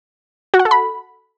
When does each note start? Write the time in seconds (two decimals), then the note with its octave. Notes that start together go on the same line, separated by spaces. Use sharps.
0.54 F#4
0.59 F#5
0.65 A4
0.71 B5